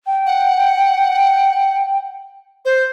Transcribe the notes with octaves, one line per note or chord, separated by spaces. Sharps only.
G5
F#5
C5